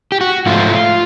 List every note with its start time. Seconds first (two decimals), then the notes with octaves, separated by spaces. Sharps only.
0.12 G4
0.21 F#4
0.46 G#2 F3 A3 F4